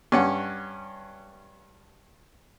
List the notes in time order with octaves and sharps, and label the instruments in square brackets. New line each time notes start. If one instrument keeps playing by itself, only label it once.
[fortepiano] G2 C#4 F#5